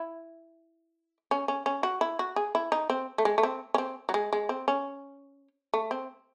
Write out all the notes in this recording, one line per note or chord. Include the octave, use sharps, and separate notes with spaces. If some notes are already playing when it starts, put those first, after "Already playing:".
Already playing: E4
C#4
C#4
C#4
F#4
E4
F#4
G#4
E4
D#4
C4
A3
G#3
A3
C4
C#4
C4
F#3
G#3
G#3
C4
C#4
A3
C4